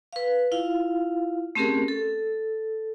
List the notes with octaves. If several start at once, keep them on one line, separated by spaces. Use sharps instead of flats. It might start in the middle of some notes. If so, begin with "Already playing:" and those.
B4 F5
E4 F4 F5
A3 C4 C#4 G4 G#4 A#4
A4